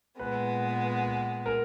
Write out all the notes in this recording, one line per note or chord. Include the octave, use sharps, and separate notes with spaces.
A#2 G#3 B3 B4
A#4